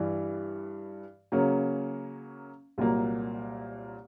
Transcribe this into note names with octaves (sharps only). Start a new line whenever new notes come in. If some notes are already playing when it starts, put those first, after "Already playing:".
Already playing: G2 E3 G3
C#3 F#3 A#3 C#4
C2 A#2 F#3 A#3